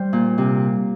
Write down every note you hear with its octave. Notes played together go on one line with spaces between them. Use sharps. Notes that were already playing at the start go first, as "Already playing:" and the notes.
Already playing: G3 C5
A#2
C3